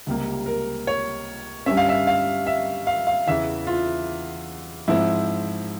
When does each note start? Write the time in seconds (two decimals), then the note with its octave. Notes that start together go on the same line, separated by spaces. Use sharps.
0.06 C#2 C3 G3 A#3
0.46 A#4
0.87 C#5
1.66 G2 G3 C#4 E5
1.77 F5
1.89 E5
2.07 F5
2.47 E5
2.87 F5
3.07 F5
3.27 E2 C#3 E3 E5
3.67 F4
4.88 G#2 F3 C4 E4